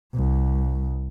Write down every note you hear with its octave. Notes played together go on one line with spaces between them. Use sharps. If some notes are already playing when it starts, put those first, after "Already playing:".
C2